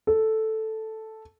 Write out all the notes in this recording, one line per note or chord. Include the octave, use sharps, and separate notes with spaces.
A4